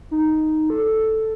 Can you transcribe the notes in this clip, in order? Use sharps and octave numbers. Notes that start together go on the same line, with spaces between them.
D#4
A4